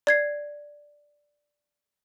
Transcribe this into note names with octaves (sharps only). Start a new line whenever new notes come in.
D5 G#6 C7